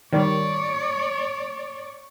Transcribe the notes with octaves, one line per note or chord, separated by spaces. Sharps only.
D#3 G3 C#5 D5